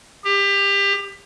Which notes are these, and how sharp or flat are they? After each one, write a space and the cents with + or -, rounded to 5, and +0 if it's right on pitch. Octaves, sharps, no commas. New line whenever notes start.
G4 +25